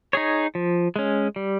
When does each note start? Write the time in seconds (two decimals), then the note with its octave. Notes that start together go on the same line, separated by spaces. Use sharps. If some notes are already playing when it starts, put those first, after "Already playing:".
0.13 D#4 G#4 C#5
0.55 F3
0.96 G#3 C#4
1.36 G3